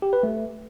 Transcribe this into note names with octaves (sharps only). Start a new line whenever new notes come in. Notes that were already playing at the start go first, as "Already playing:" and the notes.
G4
B4
A3